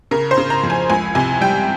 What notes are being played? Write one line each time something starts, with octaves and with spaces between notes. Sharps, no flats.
C#3 A#4
C5
C#3
A#5
F2
G#5
C#2 G#5
C3 G#5
G3 G5